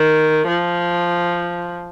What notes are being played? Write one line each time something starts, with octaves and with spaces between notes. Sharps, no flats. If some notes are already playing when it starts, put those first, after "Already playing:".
Already playing: D#3
F3